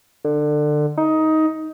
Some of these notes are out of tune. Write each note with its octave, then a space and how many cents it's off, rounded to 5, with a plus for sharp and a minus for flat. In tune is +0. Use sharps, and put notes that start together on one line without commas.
D3 +25
D#4 +15